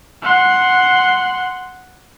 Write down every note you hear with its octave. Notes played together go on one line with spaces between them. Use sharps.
F#5 C6